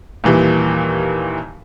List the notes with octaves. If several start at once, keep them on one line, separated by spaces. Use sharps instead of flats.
D#2 A#2 E3 G3